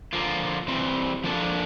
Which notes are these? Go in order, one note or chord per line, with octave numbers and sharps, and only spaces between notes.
D3 F3 A#3 F4
E3 G3 C4
F3 A#3 D4 A4